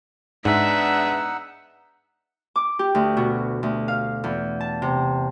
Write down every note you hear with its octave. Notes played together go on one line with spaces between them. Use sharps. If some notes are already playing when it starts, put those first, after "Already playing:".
G#2 G#3 B3 D4 D#4 E5 F#5 E6
D6
G4
D2
B2
D2
F5
E2
A5
C3